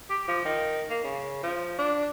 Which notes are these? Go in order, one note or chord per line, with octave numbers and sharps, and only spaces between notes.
G4
F3
D#3
A#3
C#3
F3
D4